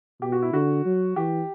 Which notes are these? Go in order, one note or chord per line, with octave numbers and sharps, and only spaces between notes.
B2 G4
F#4
E4
D3 F#4
F#3
E3 G4